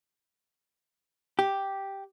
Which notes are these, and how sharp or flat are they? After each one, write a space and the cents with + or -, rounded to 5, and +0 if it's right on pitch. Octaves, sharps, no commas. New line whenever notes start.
G4 +0